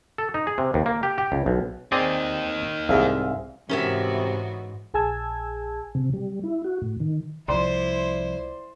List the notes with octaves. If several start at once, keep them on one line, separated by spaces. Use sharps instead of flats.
A4
D#4
G#4
C3
D#2
A#3
G4
G4
C#2
B1
A#3 C4 D#4 G#4 D5
C2 G#2 G#4 E5 F5
G#2 C3 E3 B3 C#4 F#4 A#4 E5
A#1 G#4 G#5 A5 E6 G#6
C3
G3
E4
F#4
A2
D#3
C2 F3 E4 C5 D5 C6